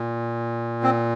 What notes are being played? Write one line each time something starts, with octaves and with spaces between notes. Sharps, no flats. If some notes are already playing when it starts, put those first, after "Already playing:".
Already playing: A#2
C4